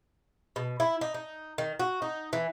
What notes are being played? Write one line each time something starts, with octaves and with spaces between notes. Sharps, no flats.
B2
E4
D#4
D#4
D#3
F#4
D#4
E3